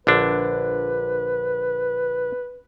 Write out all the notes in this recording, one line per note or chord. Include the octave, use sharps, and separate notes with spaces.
A#1 D3 D4 B4